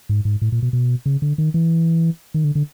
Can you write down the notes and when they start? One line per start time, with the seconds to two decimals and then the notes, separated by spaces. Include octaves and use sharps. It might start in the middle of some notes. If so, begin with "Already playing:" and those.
0.09 G#2
0.25 G#2
0.42 A2
0.52 A#2
0.62 B2
0.73 B2
1.06 C#3
1.22 D3
1.38 D#3
1.54 E3
2.34 D#3
2.44 D3
2.55 D3